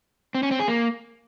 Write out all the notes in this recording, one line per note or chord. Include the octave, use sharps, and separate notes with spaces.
C4
C#4
C4
G#4
A#3